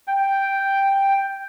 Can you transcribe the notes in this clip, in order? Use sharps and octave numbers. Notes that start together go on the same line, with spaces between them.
G5